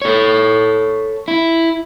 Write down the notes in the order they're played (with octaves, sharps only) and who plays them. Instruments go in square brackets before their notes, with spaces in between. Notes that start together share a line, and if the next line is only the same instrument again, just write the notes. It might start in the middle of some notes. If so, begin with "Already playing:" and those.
[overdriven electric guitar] A4 C#5
E4